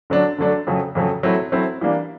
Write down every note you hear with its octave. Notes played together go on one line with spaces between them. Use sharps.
D3 F#3 A3 D4
D3 F#3 A3 D4
F2 C#3 F#3 A3
F2 C#3 F#3 A3
F#3 A3 C4 E4
F#3 A3 C4 E4
E3 G3 A#3 D4